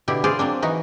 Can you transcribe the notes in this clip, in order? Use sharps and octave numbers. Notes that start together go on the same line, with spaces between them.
B2 D3 E4 G4
G#4 C5 D5 F5
F#3 A#3 C4 D4
E3 D#4 F#4